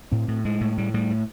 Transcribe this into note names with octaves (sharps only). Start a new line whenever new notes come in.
A2 C4
A2
A2 G#3
A2
A2 G3
A2 G3
A2